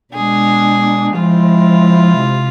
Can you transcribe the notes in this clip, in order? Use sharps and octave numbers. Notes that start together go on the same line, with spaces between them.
B2 G#3 D4 G#4
F3 G#3 C4 E4 F4
C3